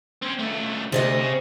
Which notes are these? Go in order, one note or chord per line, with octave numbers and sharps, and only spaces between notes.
C4 C#4
C#2 A3
D2 C3 D5 D#5
C#3